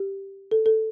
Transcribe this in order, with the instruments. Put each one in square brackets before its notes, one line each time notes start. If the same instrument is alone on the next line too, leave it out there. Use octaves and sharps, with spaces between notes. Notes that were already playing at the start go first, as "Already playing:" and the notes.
Already playing: [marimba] G4
A4
A4